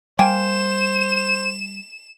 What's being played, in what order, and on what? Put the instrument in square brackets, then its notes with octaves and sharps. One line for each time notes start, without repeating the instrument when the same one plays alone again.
[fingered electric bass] G3 [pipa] A#3 G5 G#5 [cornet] C5 [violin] E7